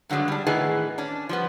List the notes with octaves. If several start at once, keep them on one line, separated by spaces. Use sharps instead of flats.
G2 D3 F#3 G#3 D4
G3 D4
A2 D#3 E3 B3 G#4 D#5
C#4 D4
F3 G3 B3